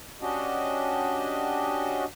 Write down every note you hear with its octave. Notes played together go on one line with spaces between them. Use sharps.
C#4 D4 F#4 G4 D#5